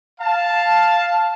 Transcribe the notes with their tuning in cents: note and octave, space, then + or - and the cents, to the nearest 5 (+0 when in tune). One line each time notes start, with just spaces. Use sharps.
F5 +0 A5 +0